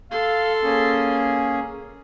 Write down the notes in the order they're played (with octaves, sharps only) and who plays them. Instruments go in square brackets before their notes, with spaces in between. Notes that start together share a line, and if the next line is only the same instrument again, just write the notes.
[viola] A4 C6 [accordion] F5
[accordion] A#3 C#4 G#4